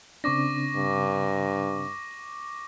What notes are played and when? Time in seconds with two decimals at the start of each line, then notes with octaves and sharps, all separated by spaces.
0.24 C#3 C4 D4 C#6 D6 A#6
0.76 G2